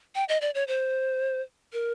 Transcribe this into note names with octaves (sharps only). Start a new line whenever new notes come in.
G5
D#5
D5
C#5
C5
A#4